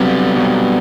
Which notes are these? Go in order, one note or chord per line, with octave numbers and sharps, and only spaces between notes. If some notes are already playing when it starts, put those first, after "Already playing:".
Already playing: C3 F#3 G3 B3 C4
B2 F#3 C4